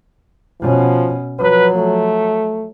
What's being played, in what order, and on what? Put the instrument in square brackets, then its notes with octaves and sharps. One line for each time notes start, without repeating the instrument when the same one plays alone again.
[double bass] B2 C#4 [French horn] F3
[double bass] F3 F#3 [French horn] B4
[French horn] A3